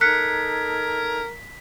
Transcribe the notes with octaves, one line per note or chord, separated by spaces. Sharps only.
D#4 A4 A#4 F#6 G#6 B6 C#7